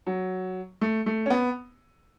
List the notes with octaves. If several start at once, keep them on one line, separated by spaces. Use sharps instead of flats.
F#3
A3
A3
C#4
B3